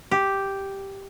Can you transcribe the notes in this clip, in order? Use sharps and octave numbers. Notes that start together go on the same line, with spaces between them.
G4